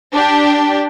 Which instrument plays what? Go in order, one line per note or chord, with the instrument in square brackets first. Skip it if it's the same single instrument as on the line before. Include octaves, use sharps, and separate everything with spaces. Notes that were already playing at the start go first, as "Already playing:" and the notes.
[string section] D4 G4